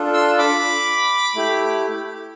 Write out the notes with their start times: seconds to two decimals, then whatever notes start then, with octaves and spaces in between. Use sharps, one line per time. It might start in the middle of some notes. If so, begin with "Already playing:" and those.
Already playing: D4 F4 A4
0.14 C6 E6
0.38 B5 D6
1.35 A3 E4 G4